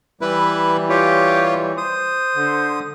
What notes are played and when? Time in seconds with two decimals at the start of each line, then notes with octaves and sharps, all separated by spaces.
0.21 E3 G3 E4 B4
0.89 F4 G4 C#5
1.78 C5 D#6
2.35 D3